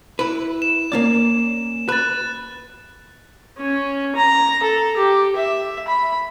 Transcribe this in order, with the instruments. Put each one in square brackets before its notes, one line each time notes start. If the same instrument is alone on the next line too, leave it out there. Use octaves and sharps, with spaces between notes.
[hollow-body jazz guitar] E4 B4
[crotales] E7
[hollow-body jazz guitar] A#3 C#4 D5
[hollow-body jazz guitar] B4 [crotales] F#6 A6
[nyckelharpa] C#4
A#5
A4
G4
E5
B5